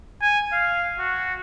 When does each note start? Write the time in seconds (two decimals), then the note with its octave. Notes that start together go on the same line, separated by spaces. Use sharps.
0.22 G#5
0.52 F5
0.99 F#4